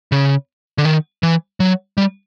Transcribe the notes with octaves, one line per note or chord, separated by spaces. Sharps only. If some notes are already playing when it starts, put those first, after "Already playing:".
C#3
D3
D#3
E3
F#3
G3